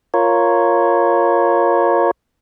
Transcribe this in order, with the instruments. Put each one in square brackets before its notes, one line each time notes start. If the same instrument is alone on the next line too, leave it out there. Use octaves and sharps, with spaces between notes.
[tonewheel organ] F4 A#4 C#5